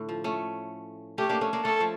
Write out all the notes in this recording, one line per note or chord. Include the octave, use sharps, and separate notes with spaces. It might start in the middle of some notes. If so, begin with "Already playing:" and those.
Already playing: A2 D3
F3
A3 C#4
A3 C#4 G4
A#3 D4
A3 C#4
A#3 D4
A3 C#4 A4
F3 A3